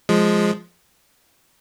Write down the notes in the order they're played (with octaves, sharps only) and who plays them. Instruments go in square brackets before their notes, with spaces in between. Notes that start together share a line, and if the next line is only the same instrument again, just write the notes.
[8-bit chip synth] F3 G#3